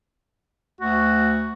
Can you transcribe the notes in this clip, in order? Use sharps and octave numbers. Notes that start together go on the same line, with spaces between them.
D2 F#4